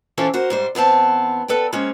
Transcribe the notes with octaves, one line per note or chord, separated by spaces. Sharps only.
E3 C#4 F4 A4 C5
F#4 A#4 C5
G#2 G3 C5
E2 B3 C4 A5
A4 B4 D5 G5
G#3 A#3 C4 C#4